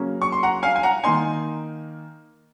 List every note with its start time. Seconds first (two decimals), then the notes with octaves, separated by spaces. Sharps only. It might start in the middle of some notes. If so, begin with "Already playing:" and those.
Already playing: C#3 F#3 A#3 C#4
0.22 C#6
0.32 C6
0.43 F#5 A#5
0.63 F5 G#5
0.76 G#5
0.83 F#5 A#5
1.04 D#3 A#3 D#4 G#5 C6